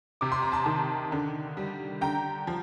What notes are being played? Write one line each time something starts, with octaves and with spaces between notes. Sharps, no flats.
C3 D6
C6
A#5
A5 C6
D#3
D3
G3
D3 G5 A#5
F3